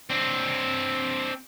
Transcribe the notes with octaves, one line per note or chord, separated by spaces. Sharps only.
C4 D4